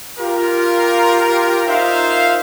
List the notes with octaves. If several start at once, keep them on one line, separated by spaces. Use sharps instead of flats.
F4 G4 A#4
D#4 F4 A#4 C5 E5 F5